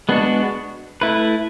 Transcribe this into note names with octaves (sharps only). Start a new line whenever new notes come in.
G#3 B3 D4 F#4
A3 E4 B4